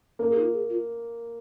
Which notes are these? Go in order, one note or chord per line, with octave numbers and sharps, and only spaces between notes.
A#3 A#4
G#4
D#4
F4
G#4
F4